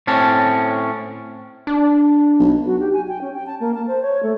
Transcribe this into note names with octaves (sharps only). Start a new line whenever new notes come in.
A2 C4 C#4 A5
D4
B1
F#4
G4
G#5
G5
C#4
G5
A5
A#3
A5
C5
C#5
A3